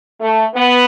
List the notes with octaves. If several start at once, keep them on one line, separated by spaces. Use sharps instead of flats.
A3
B3